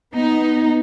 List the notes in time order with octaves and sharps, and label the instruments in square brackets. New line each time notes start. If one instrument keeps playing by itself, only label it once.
[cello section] B3 D#4